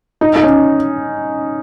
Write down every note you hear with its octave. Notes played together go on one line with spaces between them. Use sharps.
D#4
D#4
C#4